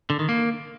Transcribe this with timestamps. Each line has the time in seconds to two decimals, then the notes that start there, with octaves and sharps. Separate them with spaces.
0.10 D3
0.19 D#3
0.29 A#3